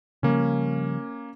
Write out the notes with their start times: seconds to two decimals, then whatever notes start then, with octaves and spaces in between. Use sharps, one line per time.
0.23 C#3 F3 G3 A#3 C#4